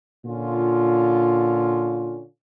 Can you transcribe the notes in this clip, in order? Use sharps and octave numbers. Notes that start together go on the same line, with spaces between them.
A#2 D3 C#4 F4